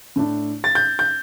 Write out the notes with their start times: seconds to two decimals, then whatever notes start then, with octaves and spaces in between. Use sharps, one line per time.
0.16 A2 A3 D4
0.64 A6
0.75 G6
0.99 G6